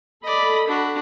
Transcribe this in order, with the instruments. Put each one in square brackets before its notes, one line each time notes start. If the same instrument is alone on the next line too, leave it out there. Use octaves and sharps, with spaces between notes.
[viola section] A4 B5 [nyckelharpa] D5 D#5
[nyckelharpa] D4 F#4